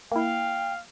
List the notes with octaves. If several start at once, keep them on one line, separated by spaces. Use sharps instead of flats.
A#3 E4 F5 G5